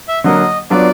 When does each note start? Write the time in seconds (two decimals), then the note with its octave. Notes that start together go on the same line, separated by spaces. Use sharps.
0.08 E5
0.24 D3 F#3 A#3 D#5
0.70 F#3 B3 D4 F4 D5